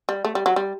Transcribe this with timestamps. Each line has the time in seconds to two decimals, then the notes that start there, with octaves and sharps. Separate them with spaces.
0.09 G3
0.25 A3
0.35 G3
0.46 F#3
0.56 G3